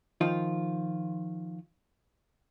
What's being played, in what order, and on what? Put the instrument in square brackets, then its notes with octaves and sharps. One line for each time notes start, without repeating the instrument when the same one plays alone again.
[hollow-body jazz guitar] D#3 F3 F4